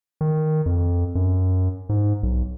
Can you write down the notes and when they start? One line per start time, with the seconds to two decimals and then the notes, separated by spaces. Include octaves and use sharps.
0.21 D#3
0.66 F2
1.15 F#2
1.89 G#2
2.23 B1